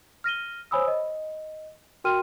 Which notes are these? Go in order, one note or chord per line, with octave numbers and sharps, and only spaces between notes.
F6 A#6 D#7 G7
C5 C#5 G#5 B5 D#6 E6
D#5
F#4 A#4 G5 C6 F6 D#7